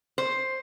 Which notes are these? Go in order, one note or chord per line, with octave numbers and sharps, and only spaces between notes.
C5